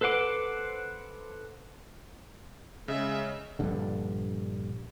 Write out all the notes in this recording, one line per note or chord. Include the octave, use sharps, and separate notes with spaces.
A4 B4 C5 F#5 D6
C#3 G#3 E5
A#1 G2 D3